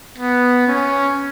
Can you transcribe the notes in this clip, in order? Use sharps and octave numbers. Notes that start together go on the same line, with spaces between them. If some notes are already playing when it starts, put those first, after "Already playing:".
B3
C#4